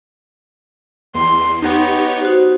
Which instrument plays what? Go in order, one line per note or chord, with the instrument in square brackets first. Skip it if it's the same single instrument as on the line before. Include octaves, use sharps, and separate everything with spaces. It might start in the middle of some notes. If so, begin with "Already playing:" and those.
[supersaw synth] E2 [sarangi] C6
[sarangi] B3 [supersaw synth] D#4 G4 C#5
[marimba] D#4 F#4 C5